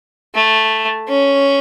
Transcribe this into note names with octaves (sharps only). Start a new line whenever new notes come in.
A3
C#4